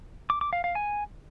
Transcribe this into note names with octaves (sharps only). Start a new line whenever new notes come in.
D6
D6
F5
F5
G#5